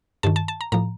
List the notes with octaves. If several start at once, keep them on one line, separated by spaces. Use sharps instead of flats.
G2 D#3 A5
A5
A5
A#5
A2 F3 A#5